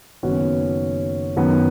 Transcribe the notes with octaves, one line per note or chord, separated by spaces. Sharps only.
F#1 F#2 D#3 B3 C#4 F#4
F#2 D#3 B3